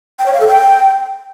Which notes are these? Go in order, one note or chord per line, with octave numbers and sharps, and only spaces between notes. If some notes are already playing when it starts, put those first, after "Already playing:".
G5
C#5
F5
A4
G5